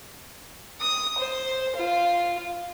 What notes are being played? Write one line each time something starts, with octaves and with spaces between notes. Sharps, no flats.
D#6
C5
F4